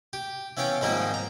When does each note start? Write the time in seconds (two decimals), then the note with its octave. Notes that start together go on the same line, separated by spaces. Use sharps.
0.13 G4
0.57 E3 B3 C#4 F5 G5
0.81 G#2 D#3 F3 G3 A#3 C4
1.14 A#5